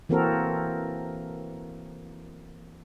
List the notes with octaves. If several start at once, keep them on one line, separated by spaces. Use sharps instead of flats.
E3 A#3 C4 F#4 A4 A#4